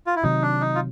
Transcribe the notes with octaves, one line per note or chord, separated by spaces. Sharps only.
F4
E4
C3 D#3 F#3 D#4
D4
D#4
F4